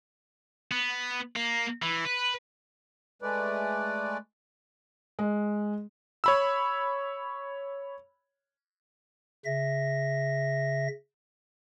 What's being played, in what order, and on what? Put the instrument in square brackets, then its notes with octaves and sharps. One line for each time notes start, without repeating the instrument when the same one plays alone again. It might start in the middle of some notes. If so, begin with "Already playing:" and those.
[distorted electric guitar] B3
A#3
E3
B4
[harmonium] G#3 A3 B4 D5
[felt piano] G#3
[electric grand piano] C#5 B5 E6
[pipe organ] C#3 E5 A#6